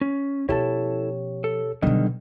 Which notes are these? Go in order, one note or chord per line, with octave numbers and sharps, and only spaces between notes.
C#4
B2 F3 C#4 E4 G4 A4 C#5 A5
A4
B2 D3 D#3 F#3 G3 B3 D4 D#5